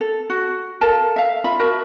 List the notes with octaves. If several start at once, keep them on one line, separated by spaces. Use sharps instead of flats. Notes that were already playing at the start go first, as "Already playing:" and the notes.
A4
F#4
A4 A#4 F5 A5
E5 F5
F4 E5 B5
F#4 A#4 E5 A5